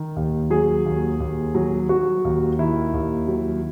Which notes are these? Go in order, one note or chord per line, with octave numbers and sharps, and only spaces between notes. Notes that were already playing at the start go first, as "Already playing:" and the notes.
Already playing: D#3
D#2
F#3 G#4
D#2
D#2
F#3
F#3 F#4
D#2
D#3 E4
D#2
F#3